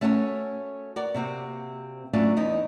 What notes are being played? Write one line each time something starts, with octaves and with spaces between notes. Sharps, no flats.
A3 C#4 F#4 A4 A#4 C#5
F#4 A#4 D5
C3 A#3 C4 F#4
F#3 A3 A#3 C#4 D4 F4
E2 D#4